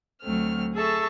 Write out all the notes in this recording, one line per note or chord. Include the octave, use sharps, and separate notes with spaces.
D2 F#3 A3 C4 F6
G#4 A4 E5 A5 C#6